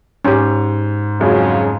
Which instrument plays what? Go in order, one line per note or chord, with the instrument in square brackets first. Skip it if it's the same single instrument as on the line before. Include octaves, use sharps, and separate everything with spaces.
[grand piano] G#2 [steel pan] C#4 G4
[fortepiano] F2 G#3 [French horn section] C#3 F#3